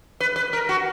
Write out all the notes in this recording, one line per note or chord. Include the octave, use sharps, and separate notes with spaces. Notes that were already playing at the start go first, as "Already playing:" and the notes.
B4
B4
A#4
F#4